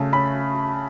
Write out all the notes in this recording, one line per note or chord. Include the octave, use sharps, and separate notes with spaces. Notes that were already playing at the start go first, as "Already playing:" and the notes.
Already playing: C#3 A3 A5
C#4 B5